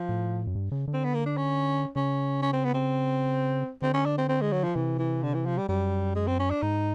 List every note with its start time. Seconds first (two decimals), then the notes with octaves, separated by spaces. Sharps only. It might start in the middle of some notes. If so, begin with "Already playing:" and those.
Already playing: F3
0.09 A2
0.47 F#2
0.55 G2
0.72 C#3
0.88 D3
0.94 C4
1.04 B3
1.15 A#3
1.26 D4
1.37 C#4
1.96 C#3 C#4
2.42 C#4
2.53 C4
2.64 B3
2.74 C4
3.82 D3 C4
3.94 C#4
4.06 D4
4.18 C4
4.29 C4
4.41 G#3
4.53 F#3
4.64 F3
4.76 C3 E3
4.99 E3
5.23 D3
5.34 E3
5.46 F3
5.58 G3
5.69 F#2 G3
6.16 G#3
6.27 C4
6.39 C#4
6.51 D4
6.62 G#2 D#4